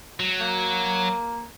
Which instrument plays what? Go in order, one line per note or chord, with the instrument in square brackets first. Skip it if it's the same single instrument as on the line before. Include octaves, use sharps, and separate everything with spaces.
[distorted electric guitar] F#3
[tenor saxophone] A#3